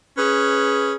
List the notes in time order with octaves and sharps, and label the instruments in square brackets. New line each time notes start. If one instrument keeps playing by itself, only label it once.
[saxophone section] C#4 G#4 B4